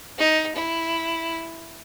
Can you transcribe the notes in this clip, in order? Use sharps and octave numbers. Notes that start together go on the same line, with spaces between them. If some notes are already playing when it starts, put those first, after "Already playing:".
D#4
E4